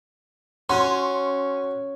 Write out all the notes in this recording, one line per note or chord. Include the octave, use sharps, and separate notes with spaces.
C#4 F#4 C6